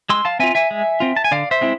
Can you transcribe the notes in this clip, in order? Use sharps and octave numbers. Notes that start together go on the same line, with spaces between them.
G#3 C6 E6
F5 A5
C4 F4 E5 G#5
E5 G#5
G#3
C4 F4
A5
G#5
D3 D5 F5
C5 E5
G#3 C4 E4